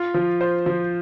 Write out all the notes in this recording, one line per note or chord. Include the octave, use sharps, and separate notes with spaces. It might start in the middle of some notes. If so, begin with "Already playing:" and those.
Already playing: F4
F3
C5
F3